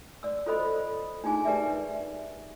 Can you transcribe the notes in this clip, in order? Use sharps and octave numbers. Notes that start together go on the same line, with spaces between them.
D5 E6
F4 A4 C5 D#5 B5
D4 D#4 F4 G#4 G#5
G4 A#4 B4 D5 E5